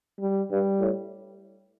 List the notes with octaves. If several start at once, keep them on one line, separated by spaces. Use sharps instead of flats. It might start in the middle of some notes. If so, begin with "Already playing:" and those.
G3
G2 G3
A2